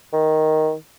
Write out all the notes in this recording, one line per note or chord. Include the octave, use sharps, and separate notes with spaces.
D#3